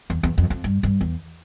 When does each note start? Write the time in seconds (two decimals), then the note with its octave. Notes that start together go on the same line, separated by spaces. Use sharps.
0.10 E2
0.23 E2
0.38 F2
0.50 F2
0.64 G2
0.83 G2
1.01 E2